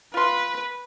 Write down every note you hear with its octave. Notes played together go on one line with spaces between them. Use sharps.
F4 B4 C6